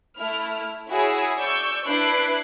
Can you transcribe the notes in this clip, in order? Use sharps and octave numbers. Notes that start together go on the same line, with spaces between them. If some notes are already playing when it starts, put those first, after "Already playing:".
A3 E4 F6
E4 F#4 G#4 C#5 G#5 E6
D5 C#6 E6 G6
D4 E4 B4 F#6 C7 D7